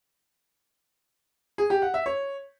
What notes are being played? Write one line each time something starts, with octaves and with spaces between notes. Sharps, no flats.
G#4
G4
F#5
E5
C#5